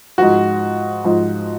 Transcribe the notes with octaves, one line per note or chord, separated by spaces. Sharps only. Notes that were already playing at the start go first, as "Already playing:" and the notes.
G#2 F3 F#4
G#2 F3